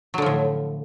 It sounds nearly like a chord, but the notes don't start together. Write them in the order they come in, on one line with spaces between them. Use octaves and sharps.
F#3 D3 F3 A2